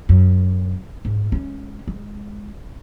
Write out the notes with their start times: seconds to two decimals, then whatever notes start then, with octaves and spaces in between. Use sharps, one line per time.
0.09 F#2
1.05 G#2
1.32 G#3 C#4
1.88 G#3